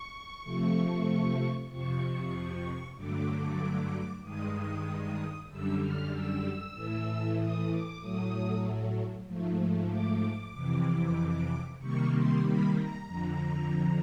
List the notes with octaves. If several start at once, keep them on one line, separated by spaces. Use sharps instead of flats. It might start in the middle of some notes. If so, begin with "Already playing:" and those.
Already playing: C#6
C3 F3 A3
F2 C3 F3 C#6
G2 D3 F#3 A3 D6
G2 D#3 G#3 D#6
F#2 D3 G3 E6
F6
E6
A2 E3 A3
D#6
D6
A2 F#3 A3 D#6
G#2 F3 A3
D6
F2 C3 E3
C3 D#3 G3 A#3 C#6
C6
B5
A#5
F2 D3 F3